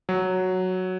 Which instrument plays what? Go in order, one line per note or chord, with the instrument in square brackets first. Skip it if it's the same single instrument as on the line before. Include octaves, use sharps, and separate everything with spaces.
[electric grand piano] F#3